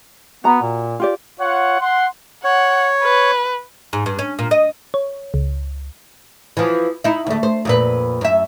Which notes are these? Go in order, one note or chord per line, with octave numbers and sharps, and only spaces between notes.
B3 F#4 A#5
A#2
F4 G4 D5
F4 C#5 F#5
F#5 C6
C#5 F#5
B4
G#2
G2
C#4
A#2
D#5
C#5
C#2
E3 F3
D#4 E4
D2 A3
C5
F2 A#2 B4
F#2 E5